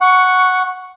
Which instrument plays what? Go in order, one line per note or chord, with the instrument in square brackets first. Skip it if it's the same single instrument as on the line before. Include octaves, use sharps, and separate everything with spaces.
[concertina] F#5 [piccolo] C#6